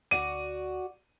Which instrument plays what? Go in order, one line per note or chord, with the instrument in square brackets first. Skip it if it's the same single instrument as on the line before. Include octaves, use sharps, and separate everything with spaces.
[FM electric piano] D2 [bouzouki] F#4 D5 [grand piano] D#7